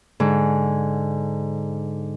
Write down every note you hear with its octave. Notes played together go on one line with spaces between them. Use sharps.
G#2 D3